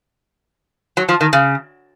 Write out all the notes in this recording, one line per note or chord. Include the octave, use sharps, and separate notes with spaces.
F#3
F3
D#3
C#3